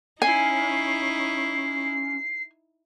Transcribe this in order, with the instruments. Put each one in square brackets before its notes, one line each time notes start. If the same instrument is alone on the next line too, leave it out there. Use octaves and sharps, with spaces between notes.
[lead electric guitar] C#4 [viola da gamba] D#4 E4 [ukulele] G#5 [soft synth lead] C7